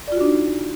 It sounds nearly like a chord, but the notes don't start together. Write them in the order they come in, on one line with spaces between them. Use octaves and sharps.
D5 F4 F#4 D4 D#4